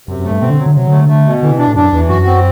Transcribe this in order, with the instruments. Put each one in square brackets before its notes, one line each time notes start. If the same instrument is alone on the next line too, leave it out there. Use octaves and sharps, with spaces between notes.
[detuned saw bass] F#2 [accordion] C3
[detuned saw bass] F#2
[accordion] A3
[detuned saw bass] G2
[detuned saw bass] B2 [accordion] C4
[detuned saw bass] D3
[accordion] F#3
[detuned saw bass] D3
[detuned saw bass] C3 [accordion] F#3
[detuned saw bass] D3 [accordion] A3
[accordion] A3
B2
[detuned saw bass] D3 [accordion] E3
[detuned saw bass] C3
[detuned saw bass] B2 [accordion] D4
[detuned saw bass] A2
[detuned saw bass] F#2 [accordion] D4
[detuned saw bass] E2 [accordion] E3
[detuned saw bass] F#2 [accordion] F#4
[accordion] C4